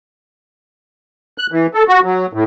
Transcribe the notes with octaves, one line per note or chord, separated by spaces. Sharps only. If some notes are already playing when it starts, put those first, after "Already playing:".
F#6
E3
A4
F#4
F#3
A2